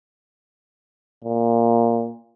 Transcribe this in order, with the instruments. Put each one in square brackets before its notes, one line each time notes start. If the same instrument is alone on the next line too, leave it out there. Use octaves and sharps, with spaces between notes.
[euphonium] A#2